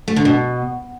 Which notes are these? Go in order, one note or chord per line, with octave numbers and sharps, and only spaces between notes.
A3
D3
B2